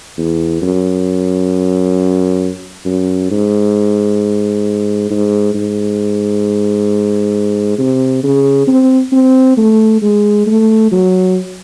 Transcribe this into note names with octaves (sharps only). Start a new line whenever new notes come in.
E2
F#2
F#2
G#2
G#2
G#2
C3
C#3
C4
C4
A3
G#3
A3
F#3